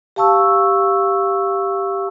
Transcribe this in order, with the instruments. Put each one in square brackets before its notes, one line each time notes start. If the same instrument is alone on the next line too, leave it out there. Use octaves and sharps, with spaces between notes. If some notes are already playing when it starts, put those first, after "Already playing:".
[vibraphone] G4 F5 A5 C#6 E6